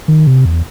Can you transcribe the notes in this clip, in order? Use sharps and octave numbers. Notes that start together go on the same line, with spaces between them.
D#3
C3
E2